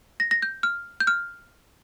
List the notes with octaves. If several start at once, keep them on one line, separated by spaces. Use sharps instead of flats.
A#6
A#6
G6
F6
G6
F6